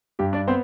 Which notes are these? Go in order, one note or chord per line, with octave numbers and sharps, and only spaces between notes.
G2 G4
D4 D5
B3 C4 C5